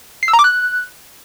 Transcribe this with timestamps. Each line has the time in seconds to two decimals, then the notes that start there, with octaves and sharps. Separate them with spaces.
0.23 C7
0.28 E6
0.33 A#5
0.39 D6
0.44 F#6